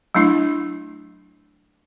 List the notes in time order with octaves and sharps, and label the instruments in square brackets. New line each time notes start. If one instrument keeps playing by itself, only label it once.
[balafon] F#3 A3 D4 E4